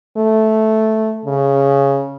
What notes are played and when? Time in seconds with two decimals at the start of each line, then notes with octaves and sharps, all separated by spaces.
0.17 A3
1.25 C#3